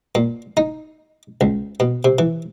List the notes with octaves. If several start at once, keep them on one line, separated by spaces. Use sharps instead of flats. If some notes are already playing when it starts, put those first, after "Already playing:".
A#2
D#4
C#2
B2
C3
E3